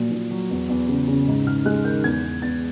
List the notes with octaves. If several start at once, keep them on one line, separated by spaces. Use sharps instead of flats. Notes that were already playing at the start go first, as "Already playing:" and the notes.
Already playing: A#2 F3 F#3
A#2
F#3
E2
E2
C#3
C#3
G#2
G#2 F6
G#3 F#6
D#3 G6
E2 G#6
E2
E2 A6